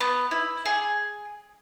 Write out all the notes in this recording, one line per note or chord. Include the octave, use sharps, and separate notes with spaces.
B3
E4
G#4